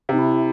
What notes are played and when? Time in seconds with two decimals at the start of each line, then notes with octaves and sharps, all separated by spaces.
0.09 C3 D#4
0.19 E4